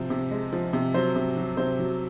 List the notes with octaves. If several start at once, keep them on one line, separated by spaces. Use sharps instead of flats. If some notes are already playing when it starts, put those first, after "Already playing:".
Already playing: C3 F3 C5
C3
G#3
F3
C3
F#3 C5
C3
F#3
C3 C5
F#3